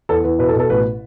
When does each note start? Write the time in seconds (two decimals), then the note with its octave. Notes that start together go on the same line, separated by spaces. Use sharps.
0.09 E2 A4
0.24 E2 B4
0.38 B2 B4
0.49 A4
0.54 B2
0.60 A4
0.70 A1 B4